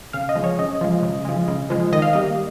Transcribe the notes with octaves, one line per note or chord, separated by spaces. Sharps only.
C#3 F5
D#5
F3 G#3
C#5
C#3 D#5
F3 G#3
C#3
F3 G#3
C#3
F3 G#3
D#3 D#5
F5
G3 A#3 D#5